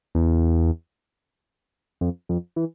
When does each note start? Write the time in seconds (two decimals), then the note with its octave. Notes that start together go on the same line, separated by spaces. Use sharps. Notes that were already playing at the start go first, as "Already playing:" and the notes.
0.15 E2
2.01 F2
2.29 F2
2.56 E3